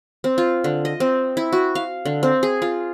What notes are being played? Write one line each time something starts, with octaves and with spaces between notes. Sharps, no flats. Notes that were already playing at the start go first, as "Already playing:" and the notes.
C4
F4
D3
D#5
C4
E4
F#4
F5
D3
C4
G#4
F4